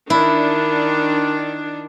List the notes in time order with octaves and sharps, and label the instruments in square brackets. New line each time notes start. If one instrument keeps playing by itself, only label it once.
[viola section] D#3 D4 [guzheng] E4